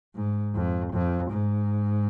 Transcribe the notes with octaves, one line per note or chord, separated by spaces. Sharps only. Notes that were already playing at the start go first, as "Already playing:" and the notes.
G#2
F2
F2
G#2